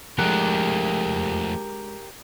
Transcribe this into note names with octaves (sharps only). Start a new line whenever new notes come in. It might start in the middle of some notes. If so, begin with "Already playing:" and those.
F3 G#3 A3 D4 G4 A#4 F#5